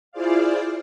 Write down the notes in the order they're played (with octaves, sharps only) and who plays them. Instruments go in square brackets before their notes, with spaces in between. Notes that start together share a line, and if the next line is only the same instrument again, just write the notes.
[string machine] E4 F4 G#4 C5 D5 F5